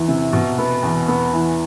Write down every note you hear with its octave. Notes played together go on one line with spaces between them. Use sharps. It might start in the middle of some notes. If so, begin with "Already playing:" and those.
Already playing: E2 E3
C3
B2
B3
E2
B3
E3